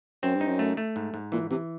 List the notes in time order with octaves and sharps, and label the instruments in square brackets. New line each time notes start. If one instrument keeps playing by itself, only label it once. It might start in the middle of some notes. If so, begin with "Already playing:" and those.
[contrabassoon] F#2 [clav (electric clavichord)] C4
[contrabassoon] G2
[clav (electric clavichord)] D#4
[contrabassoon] F#2
[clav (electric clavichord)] A3
A3
G#2
G#2
[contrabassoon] A#2 [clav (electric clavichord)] E3
[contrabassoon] C3 [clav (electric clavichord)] E3